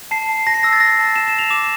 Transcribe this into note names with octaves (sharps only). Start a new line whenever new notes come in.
A5 C7
A5
A5 A#6
C7
E6 A#6
A6
E6 A#6
A5
A5 E7
E7
A5
F7
D6 E7